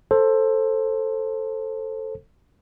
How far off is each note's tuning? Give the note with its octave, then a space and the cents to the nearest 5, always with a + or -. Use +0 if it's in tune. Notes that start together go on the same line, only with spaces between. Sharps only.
A4 +10 C5 +15